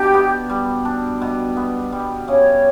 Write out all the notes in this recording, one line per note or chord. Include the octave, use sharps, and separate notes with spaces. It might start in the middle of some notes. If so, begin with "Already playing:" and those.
Already playing: B2 D4 G4
B3
G3
D4
B2
B3
G3
C#3 C#5